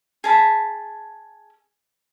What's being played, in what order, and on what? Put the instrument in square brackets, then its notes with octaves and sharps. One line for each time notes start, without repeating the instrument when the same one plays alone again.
[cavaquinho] G#4 A5 B5